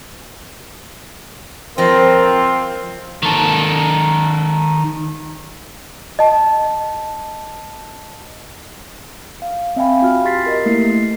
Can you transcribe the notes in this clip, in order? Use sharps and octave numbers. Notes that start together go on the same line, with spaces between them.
F3 C4 F4 A#4 D#5
D#3 A4
D#5 A5
F5
C4 E5 F5 G5 G#5 B5
F4 F#4 F6
G4 C6 A6 B6 C7
A#4 D#5 E5
A3 A#3 E4 C7